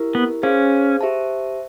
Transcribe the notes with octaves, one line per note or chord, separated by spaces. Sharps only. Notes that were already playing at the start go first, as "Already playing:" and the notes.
Already playing: E4 G4 A#4
B3
C#4 G#4 C5 F5
G4 C5 E5 A5